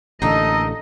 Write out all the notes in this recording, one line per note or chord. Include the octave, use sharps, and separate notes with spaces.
A1 D3 A#3 D#4 A4 D#5